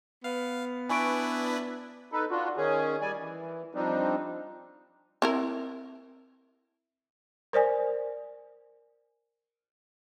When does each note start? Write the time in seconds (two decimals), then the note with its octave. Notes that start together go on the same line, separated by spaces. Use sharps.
0.24 B3 F5
0.89 D4 E4 B4 G#5 C#6 D7
2.12 D#4 A4 B4
2.30 D4 F4 F#4
2.57 D#3 C#4 G#4
3.01 G3 D5 G#5
3.19 E3
3.75 F3 G3 C4 D4 D#4
5.22 C4 E4 A#4
7.53 A#4 C5 D5 G#5